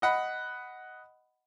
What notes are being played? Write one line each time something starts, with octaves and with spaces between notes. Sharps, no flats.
D#5 F#5 B5